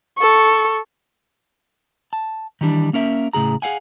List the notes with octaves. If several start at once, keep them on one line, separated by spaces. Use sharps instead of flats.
A4 C#6
A5
D#3 E3 G3 D4
A#3 C#4 A#4 E5
A2 C#3 G#4 A#5
G#4 A#4 F5 F#5 G#5